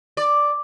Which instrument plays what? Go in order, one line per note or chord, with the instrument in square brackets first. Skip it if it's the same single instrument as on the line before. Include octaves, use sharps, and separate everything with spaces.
[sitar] D5